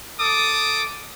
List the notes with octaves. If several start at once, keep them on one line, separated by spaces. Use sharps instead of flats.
A4 D6 D#6